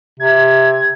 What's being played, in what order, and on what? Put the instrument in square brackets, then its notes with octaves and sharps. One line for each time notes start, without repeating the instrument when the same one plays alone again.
[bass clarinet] C3 [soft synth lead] G#6